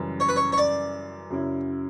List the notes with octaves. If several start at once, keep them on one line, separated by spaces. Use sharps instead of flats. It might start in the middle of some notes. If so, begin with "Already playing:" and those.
Already playing: F#2 C#3 E3 G3
C#5
B4
C#5
C#5
D5
F#2 C#3 F#3 C#4 E4